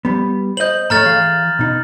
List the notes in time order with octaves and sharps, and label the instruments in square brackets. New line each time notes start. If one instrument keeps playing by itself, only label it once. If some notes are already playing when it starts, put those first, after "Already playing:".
[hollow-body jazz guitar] G3 B3
[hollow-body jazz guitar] C5 D#5 [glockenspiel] G6 F#7
[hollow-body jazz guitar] G#2 A3 C#5 [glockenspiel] A#5 F6 A6
[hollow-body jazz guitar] E3 G#4 F5
B2 D#4